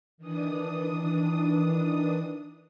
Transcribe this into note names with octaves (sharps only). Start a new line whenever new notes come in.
D#3 E3 D4 D#6